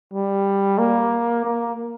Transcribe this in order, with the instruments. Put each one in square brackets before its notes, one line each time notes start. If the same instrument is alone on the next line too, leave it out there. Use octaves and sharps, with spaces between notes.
[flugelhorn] G3
A#3
A#3